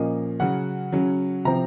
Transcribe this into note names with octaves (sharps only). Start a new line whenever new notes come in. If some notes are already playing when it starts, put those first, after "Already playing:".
Already playing: A#2 F3 A#3 C#4 D#5
C#3 F#3 C#4 F#5
C#3 F#3 C#4
C3 F3 C4 A#5